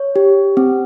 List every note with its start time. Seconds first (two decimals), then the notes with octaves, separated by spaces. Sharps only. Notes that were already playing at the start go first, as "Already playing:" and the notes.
Already playing: C#5
0.16 G4
0.57 C4